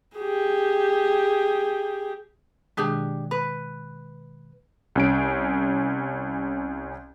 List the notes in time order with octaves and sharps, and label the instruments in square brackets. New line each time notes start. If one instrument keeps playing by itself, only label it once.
[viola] G4 G#4
[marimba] B2 D#3 G#3 [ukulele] D4 G4 G#4
[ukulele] B4
[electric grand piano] C2 C#4 D7